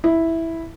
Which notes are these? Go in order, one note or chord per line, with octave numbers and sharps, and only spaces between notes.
E4